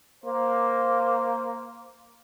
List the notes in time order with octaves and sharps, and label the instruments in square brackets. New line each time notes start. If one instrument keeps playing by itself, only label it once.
[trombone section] A#3 C5